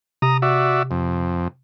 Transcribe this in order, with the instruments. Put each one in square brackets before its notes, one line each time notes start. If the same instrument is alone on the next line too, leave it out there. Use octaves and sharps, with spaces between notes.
[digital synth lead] C3 [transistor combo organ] A#5 D#6
[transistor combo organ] F#4 D5 E5
F2